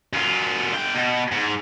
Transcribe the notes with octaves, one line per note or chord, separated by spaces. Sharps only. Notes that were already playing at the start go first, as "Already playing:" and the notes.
F#2 F4
D3 G5
B2
G#2